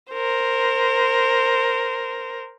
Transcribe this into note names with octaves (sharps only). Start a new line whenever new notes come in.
A#4 C5